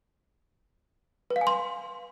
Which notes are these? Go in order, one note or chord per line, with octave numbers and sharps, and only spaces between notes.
B4
F5
G#5
C6